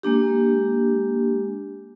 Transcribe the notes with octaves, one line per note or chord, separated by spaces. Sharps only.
G#3 A#3 D4 G4